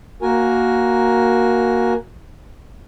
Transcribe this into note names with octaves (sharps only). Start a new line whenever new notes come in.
A#3 F#4 A#4 G#5